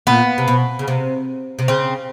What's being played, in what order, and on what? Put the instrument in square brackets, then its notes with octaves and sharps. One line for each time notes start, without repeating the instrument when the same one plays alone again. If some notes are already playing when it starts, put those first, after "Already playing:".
[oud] A#2 [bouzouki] B3
[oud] C3
B2
C#3
C3
C3
[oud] C#3 [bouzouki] C4